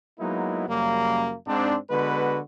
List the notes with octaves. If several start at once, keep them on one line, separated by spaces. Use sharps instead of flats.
F#3 G#3 A#3 B3 D#4 E4
F#2 C#3 G3 A#3
G#2 C4 D4
D3 G#3 B3 F#4 B4